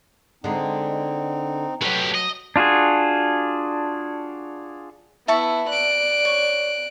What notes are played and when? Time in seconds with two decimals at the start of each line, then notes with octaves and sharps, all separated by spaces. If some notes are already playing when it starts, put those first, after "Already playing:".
0.44 D3 G#3 C4 D#4
1.82 F#3 A3 G4 B4
2.15 D#5
2.56 D4 F4 F#4 G#4
5.28 B3 E4 E5 A5 C#6
5.69 D5 F#6 D7
6.25 C#5